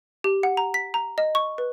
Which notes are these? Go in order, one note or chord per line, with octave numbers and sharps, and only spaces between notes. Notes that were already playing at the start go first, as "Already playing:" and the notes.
G4
F#5
A#5
B6
A#5
D#5
C#6
B4